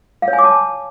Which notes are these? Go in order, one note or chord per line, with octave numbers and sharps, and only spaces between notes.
F5
C#5
G#5
D6
A5